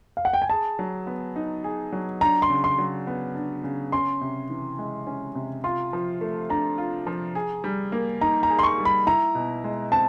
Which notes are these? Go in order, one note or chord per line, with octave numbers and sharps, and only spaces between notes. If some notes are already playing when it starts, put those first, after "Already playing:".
F5
F#5
G5
G#5
G#4 A5
F#3
B3
D#4
G#4
F#3
D4 A#5
C6
C#3
C6
F#3
B3
D4
C#3
C#4 C6
C3
E3
G#3
C#4
C3
F4 C6
F3
A3
D4 A#5
F4
F3
G#4
G3
A#3
D#4 A#5
A#5
G#4
C6
C#6
G3
B5
E4 A#5
B2
G#3
C4 A5